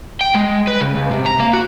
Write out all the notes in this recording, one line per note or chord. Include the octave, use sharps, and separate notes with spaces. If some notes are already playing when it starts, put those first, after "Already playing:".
G5
G#3
B4
C#3
C#2
C3
A#5
A#3
F#4